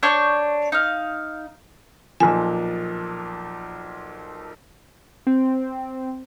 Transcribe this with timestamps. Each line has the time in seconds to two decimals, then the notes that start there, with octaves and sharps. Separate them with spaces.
0.03 D4 C#5 C#6 G6
0.72 D#4 F5
2.20 B1 A#2 F3 G#5
5.27 C4